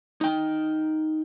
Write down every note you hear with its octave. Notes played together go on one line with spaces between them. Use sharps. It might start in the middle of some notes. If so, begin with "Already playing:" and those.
D#4 G5